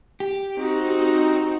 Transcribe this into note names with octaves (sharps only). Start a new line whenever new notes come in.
G4
C4 D#4 F#4